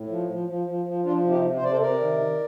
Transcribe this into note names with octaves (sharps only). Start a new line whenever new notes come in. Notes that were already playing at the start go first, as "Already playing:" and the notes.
Already playing: A2
F3
F3
F3
F3
F3
F3 D4 F4
C3
D#4 G4
C3
C5
C3 D5
A4 C5
C3 A#4 D5
D#3
D#3